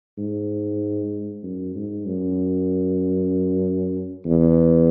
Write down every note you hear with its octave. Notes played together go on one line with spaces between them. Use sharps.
G#2
F#2
G#2
F#2
E2